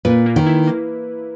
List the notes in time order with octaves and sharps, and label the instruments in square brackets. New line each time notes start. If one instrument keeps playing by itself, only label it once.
[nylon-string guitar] A#2 [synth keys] B4
[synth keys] A#3
[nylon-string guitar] D#3
[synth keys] E4
A#3